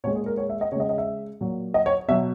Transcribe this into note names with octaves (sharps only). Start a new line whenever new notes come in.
A#2 G#3 C#5
G#4
A#4
C#5
E5
D#5
C#3 G#3 C#5 D#5
D#5
E5
A#2 F#3
D#5
C#5
B2 F#3 E5